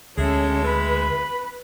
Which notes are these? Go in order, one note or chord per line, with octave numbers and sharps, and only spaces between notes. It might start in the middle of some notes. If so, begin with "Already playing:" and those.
D2 G#3 C#4 A4 E5
B4 B5